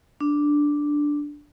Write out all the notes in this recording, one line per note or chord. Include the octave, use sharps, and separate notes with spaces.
D4